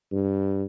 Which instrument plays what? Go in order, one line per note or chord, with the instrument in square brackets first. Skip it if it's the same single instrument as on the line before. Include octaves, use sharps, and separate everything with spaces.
[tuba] G2